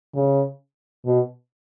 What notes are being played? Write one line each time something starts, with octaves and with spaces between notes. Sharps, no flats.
C#3
B2